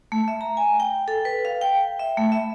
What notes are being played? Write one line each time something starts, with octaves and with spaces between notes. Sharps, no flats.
A3
E5
A#5
G#5
G5
A4
B4
F5
G5
E5
A3
E5